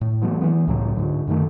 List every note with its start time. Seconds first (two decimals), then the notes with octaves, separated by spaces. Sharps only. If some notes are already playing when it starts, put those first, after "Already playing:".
0.01 A2
0.21 E3 F#3 A3 B3
0.41 E3 B3
0.67 C#2 A2 C#3 F#3
0.96 G#2 D3
1.27 F#2 D#3 A3